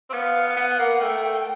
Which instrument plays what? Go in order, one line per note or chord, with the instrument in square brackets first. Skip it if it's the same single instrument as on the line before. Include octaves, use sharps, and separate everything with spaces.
[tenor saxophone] C4
[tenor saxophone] B3 [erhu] F5
[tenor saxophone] B3 [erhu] F#5
[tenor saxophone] A#3
[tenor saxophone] A3 [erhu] G5